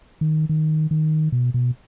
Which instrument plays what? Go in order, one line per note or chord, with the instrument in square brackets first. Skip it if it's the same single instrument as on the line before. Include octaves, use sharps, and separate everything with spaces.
[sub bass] D#3
D#3
D#3
B2
B2